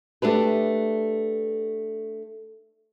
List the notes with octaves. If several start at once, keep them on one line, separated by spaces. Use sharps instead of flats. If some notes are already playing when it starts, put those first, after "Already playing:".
A3 D4 G4 B4